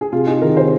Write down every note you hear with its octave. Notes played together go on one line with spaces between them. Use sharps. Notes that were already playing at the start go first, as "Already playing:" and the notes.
G#4
C3 F4
D#4 G#4
D#3 A#4
C3 C5